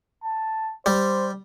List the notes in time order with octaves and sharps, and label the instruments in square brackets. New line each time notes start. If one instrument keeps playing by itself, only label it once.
[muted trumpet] A5
[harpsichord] G3 [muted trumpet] C5